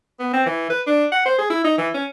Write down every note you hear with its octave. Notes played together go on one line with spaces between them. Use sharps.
B3
C4
E3
B4
D4
F#5
C5
G#4
E4
D#4
E3
C#4